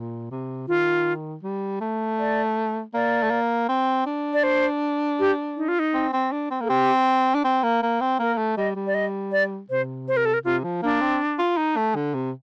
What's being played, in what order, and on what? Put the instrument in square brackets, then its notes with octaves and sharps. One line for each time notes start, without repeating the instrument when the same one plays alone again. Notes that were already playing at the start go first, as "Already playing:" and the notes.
Already playing: [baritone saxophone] A#2
C3
[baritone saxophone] D#3 [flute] F4
[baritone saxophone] G3
A3
[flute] D5
[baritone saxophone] A#3 [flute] D5
[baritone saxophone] A3
A#3
C4
D4
[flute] D5
C5
G4
D#4
F4
D#4
[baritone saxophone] C4
C4
D4
C4
[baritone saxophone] A#3 [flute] A4
[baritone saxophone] C4 [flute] G4
[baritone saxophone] D4
C4
A#3
A#3
C4
[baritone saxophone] A#3 [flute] A#4
[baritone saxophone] A3
[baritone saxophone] G3 [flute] D#5
[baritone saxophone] G3
[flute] D5
D#5
D5
[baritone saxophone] C3 [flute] C5
[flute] C5
A#4
A4
A#4
[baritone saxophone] C3 [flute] F4
[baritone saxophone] F3
[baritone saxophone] A#3 [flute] D4
[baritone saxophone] C4
F4
D#4
A3
D3
C3